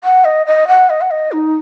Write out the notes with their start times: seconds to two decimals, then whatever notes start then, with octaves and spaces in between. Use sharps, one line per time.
0.04 F#5
0.25 D#5
0.47 D#5
0.68 F#5
0.90 D#5
1.01 F#5
1.11 D#5
1.32 D#4